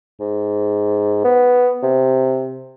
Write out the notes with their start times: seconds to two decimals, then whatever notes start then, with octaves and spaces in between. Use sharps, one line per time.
0.20 G#2
1.24 B3
1.83 C3